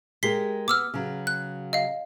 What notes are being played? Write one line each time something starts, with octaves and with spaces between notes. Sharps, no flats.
G#3 G4 A#4 B6 C7 G7
B3 D6 E6 F6
C#3 F#3
F#6
D#5 F5